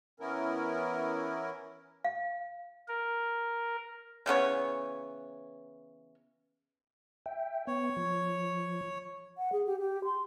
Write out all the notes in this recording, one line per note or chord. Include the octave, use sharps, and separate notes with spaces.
E3 B3 C#4 E4 A#4
F5
A#4
C#3 E3 B3 C#5
E5 G5
B3 C#5
F3
F#5
G#4
G4
G4
C6